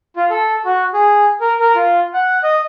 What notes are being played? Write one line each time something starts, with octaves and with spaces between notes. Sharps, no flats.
F4
A4
F#4
G#4
A#4
A#4
F4
F#5
D#5